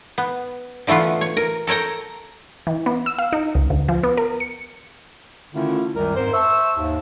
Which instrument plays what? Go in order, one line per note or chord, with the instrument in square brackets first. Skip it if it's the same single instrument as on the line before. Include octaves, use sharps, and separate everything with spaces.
[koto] B3
D3 E3 A3 B3 F4
C#5
A#4
A4 A#4 C#5 G5 A#5
[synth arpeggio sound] E3
B3
E6
F5
D#4
C#2
D2
F3
B3
A#4
C#7
[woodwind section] D3 D#3 A3 C#4 E4 F4
C#2 F#2 D#3 G3 A#4
F2 G#2 A#4 C5
C5 E5 A5 C#6 E6
D#2 G#2